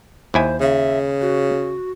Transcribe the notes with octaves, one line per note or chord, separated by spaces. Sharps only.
D#2 E4 C5 G#5
C#3 E5
F#4